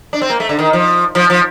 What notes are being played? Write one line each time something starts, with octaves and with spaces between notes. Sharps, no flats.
D4
C4
A#3
A3
D3
D#3
F3
F3
F3